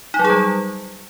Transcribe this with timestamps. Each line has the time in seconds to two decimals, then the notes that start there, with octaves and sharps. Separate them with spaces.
0.14 D#4
0.19 F#3
0.25 G#4
0.30 G3